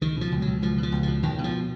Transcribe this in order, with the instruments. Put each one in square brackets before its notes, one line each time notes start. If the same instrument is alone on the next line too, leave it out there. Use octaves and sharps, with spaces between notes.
[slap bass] C#2 D#3
B2 F3
C#2
B2 F#3
C#2 F3
B2
F3
C#2
B2 F3
C#2 D#3
B2
F3